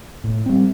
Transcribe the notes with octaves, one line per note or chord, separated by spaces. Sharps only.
A2
G3 C4